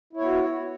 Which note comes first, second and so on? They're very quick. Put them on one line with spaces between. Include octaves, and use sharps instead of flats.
E4 C#5 B3 F#4